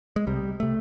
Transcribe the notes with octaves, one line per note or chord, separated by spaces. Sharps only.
G#3
C2 C3 G3
C3 A3